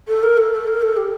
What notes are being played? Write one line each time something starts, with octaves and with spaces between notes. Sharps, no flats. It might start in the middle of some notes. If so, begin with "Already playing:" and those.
A4
A#4
A4
A4
A#4
A4
G4